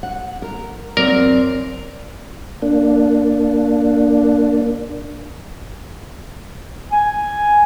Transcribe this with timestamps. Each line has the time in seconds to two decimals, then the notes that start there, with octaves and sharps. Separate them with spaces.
0.03 F#5
0.42 A#4
0.97 F#2 C4 A#4 D5
2.62 A#3 D4
6.92 G#5